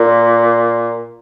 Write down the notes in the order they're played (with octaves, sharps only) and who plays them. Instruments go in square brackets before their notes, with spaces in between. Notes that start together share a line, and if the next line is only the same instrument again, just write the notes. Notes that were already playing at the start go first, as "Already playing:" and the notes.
Already playing: [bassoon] A#2